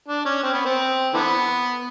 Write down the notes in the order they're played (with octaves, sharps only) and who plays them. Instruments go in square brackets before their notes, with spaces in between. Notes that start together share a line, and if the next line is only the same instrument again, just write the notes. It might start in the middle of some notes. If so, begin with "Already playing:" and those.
[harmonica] D4
C#4
C4
B3
C4
D3 E3 B3